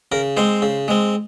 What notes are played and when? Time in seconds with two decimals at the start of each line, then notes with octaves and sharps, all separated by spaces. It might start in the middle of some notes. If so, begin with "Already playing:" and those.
0.12 C#3 A#4
0.37 G#3 C4 C5
0.62 C#3
0.88 G#3 C4